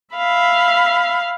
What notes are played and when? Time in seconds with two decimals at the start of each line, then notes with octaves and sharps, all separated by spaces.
0.14 E5 F5 B5